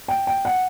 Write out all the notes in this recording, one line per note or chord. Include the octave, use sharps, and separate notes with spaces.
G5
G5
F#5